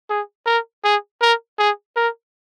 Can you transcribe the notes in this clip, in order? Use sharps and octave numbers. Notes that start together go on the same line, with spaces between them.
G#4
A#4
G#4
A#4
G#4
A#4